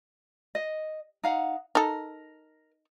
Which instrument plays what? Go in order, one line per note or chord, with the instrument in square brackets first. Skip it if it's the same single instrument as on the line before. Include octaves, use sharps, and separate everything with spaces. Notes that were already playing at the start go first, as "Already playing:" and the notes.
[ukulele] D#5
D#4 F5 F#5
[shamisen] D#4 A4 [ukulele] A#4